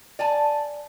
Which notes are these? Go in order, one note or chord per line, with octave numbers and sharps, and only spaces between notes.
D5 G#5 A5